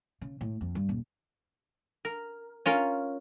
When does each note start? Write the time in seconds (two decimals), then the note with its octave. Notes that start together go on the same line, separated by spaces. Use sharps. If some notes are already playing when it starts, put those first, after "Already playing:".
0.21 C#3
0.41 A2
0.61 F2
0.75 G2
0.89 D#1
2.05 A#4
2.66 C#4 F4 A#4